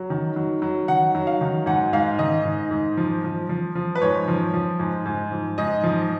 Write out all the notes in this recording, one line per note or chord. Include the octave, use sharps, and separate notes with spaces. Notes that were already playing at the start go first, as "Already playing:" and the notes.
Already playing: F#3
D#3
F#3
F#3
D#3 F#5
F#3
F5
D#3
G#2 F#5
G#2 F5
D#3 D#5
G#2
G#2
F3
F3
F3
F3
B4
G#2 C#5
F3
F3
G#2
G#2
F3
G#2 D#5
F3